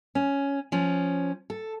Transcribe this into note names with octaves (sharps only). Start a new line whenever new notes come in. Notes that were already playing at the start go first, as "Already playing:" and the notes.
C#4
F3 C#4
A4